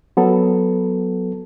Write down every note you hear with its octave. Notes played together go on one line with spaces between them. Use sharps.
F#3 B3 A4